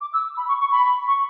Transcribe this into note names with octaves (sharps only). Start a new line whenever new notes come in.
D6
E6
B5
C#6
C#6
B5
C#6